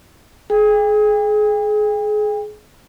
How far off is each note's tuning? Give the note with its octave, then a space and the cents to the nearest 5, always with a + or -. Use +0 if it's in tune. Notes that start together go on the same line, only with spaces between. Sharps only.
G#4 +30 G5 +40